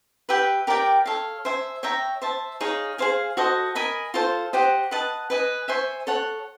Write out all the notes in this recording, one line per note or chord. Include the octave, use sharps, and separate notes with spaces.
G4 B4 E5 G5
G4 A#4 D5 G5
A4 C#5 F5
C5 E5 G#5
C#5 E5 G5 A#5
C5 E5 A5
D#4 G#4 C#5 F5
G#4 C5 F5 G#5
F#4 A4 C5 D#5
A#4 D#5 G#5 B5
F4 A4 C5
G4 C5 D#5 F#5
B4 D#5 F#5 A5
B4 D#5 G#5
C5 E5 G#5 C#6
A4 C#5 F#5